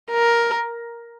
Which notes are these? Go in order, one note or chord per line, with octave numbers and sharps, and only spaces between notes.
A#4